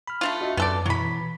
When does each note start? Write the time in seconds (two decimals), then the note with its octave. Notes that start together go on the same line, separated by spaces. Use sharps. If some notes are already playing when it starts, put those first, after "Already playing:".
0.07 B5 F6
0.21 A3 D4 F4
0.41 F#4 D#5 E5
0.57 F#2 B3 A4 D5
0.86 B2 E3 F#3 B5